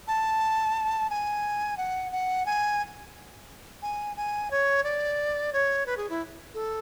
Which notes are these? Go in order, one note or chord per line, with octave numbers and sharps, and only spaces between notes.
A5
G#5
F#5
F#5
G#5
G#5
G#5
C#5
D5
C#5
B4
G#4
E4
A4